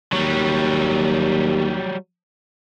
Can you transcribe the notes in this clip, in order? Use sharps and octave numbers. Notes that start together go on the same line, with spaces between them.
D#2 F#3 G3